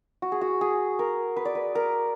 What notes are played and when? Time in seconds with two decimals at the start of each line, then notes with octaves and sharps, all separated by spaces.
0.22 F#4
0.32 G#4
0.41 F#4
0.61 G#4
0.99 A#4
1.37 B4
1.45 D5
1.55 B4
1.75 A#4